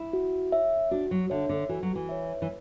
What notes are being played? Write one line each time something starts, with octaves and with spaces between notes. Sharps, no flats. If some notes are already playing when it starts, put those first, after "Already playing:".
Already playing: E4
F#4
C#5 E5
D4 F#4
F#3
D3 C#5 E5
D3
E3 F#4
F#3
E3
C#5 E5
E3